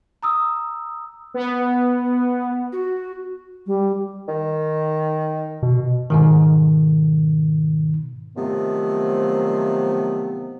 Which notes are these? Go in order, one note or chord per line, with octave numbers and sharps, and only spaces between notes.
A#5 D#6 E6
B3
F#4
G3
D#3
B2
G#2 B2 D#3
C3 D#3 F3 F#3 A3 B3